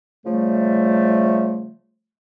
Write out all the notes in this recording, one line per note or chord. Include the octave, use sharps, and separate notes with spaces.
C#3 F3 G3 A3